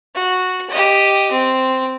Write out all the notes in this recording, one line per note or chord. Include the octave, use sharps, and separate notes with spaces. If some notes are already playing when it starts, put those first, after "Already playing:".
F#4
G4 D#5
C4